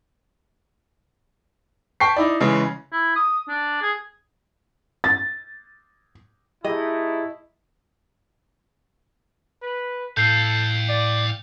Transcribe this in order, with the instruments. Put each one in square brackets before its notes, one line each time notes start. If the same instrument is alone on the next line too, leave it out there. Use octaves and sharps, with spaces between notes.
[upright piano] G5 A5 C#6 B6 C7
D#4 E4 D5
C#3 E3 G#3 C#4
[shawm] E4
D#6
D4
G#4
[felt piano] A6
[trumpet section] A3 D#4 E4 [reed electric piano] G4 G#4 [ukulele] D#5
[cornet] B4
[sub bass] A2 [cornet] A4 [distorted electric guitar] F5 G5 [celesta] G6 C7
[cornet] D5